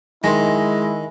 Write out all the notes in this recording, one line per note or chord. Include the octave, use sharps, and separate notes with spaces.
D#3 G#3 E4 G#5 C6